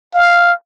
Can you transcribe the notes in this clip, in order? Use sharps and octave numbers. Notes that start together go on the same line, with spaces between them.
F5